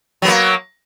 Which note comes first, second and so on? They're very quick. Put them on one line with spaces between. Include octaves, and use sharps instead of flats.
F#3 B3 A#3